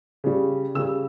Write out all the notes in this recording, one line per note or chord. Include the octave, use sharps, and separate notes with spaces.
C#3 G3
C#3 G3 E6